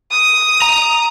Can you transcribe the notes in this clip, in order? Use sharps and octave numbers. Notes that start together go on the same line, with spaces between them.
D#6
A#5